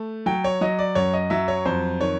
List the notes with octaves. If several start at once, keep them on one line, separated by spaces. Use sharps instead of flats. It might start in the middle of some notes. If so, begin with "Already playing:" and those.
Already playing: A3
F#3 G5
C#5
F#3 D#5
D5
F#2 C#5
D#5
F#3 E5
C#5
F2 C5
D#3 C#5